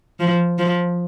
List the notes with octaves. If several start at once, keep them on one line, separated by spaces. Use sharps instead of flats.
F3
F3